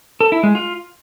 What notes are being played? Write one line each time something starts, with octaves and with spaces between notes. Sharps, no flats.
A4
E4
G#3
F4